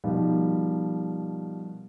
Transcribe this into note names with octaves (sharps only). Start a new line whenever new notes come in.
B2 D#3 F3 G3